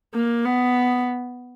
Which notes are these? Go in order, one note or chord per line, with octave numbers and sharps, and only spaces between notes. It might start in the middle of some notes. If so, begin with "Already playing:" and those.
A#3
B3